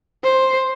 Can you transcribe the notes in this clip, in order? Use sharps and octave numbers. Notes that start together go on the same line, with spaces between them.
C5